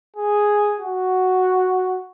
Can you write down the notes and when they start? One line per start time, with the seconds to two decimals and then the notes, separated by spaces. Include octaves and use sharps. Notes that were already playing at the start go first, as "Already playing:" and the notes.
0.16 G#4
0.80 F#4